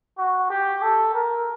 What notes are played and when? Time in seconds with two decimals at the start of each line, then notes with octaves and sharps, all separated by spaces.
0.18 F#4
0.50 G4
0.82 A4
1.14 A#4